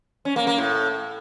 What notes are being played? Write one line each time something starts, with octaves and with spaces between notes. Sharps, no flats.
C#4
A#3
A#3
A2